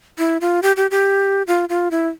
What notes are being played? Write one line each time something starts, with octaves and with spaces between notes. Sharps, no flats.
E4
F4
G4
G4
G4
F4
F4
E4